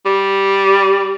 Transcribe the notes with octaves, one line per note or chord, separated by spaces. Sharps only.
G3